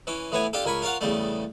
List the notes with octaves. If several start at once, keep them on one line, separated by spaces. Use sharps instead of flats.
E3 C#4 D6
A2 E3 B3 C#5 G#5
D4 F4 G4 A4
C#2 A#4 G#5 B5 C#6
F4 A#4 C#5 F5 F#5
E2 C#3 G3 A3